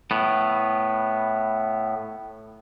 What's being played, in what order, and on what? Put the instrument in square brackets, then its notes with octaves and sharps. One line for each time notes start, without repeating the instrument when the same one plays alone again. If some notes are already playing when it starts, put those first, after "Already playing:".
[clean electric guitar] A2 B3